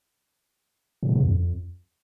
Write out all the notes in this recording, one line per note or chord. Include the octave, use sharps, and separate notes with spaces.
A2
A#2
C3
E2
F2